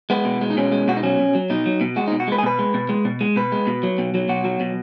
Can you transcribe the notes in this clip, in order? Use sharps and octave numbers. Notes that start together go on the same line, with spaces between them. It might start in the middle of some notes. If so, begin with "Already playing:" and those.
G#3 B3
B2
G#3
D#4
B2 C#4
G#3
B2 F#4
D#4
F#3 C#4
B2
F#3
B2 D#4
F#3
B2
G#3 F#4
D#4
B2
F#4
G#3 B4
G#4
B2 B4
G#3
B2
G#3
B2
G#3
B2 B4
G#3
B2
F#3
B2
F#3
B2 F#4
F#3
B2